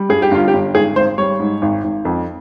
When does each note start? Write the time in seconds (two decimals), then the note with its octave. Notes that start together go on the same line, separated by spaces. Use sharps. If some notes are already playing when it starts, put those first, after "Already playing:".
Already playing: G3
0.09 G2 G#4
0.22 G4
0.31 G1 F4
0.48 G4
0.53 G1
0.75 G#1 G#4
0.96 G#1 C5
1.18 G3 C#5
1.39 G#2
1.62 G#1
1.84 G#1
2.05 F2